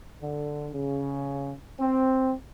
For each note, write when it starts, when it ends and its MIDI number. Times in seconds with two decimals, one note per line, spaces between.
0.20 0.67 50
0.73 1.52 49
1.79 2.33 60